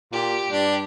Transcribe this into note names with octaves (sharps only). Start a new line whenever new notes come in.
A#2 G4
G2 D4